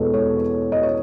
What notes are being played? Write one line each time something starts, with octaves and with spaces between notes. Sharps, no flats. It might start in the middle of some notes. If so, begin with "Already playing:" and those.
Already playing: E2 B2 G#3 B3 A4 C#5
C#5
D#5
C#5